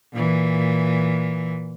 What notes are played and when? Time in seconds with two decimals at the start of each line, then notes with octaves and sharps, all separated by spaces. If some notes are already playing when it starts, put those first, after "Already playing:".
0.13 A#2 E3